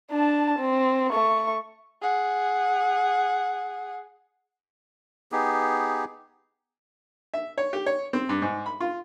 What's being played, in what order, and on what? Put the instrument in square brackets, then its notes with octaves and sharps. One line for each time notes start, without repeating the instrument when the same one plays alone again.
[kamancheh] D4 A5
C4
A3 C#6
G#4 F#5
[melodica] B3 D#4 G4 G#4
[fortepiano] E5
C#5
G4
C#5
C4
G2
G#2
B5
F4